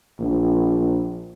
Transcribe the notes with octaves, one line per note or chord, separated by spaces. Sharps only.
A#1